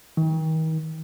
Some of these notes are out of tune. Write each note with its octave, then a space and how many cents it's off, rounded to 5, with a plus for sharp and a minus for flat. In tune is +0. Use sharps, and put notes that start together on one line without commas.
D#3 +35